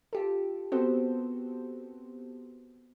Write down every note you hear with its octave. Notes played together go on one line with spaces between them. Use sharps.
F4 G4 A4
B3 C4 F#4 G4 A4 C5